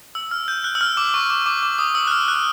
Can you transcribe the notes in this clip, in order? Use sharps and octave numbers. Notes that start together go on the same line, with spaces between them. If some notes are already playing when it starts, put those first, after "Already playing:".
E6
F6
G6
F#6
E6
F6
D6
C#6
D6
D6
D6
D#6
E6
F#6
F6
F#6